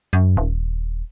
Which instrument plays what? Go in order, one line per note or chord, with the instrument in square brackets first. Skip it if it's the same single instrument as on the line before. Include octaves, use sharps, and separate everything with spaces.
[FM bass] F#2
D#1